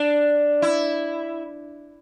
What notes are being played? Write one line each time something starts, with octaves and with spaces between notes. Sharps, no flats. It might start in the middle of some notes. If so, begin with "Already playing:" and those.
Already playing: D4
E4